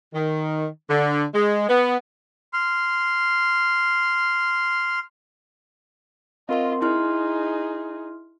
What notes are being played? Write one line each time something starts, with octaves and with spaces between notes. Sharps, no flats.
D#3
D3
G#3
B3
C6 F6
C4 F4 A#4 D#5 C6
D#4 E4 G#4 C6 F6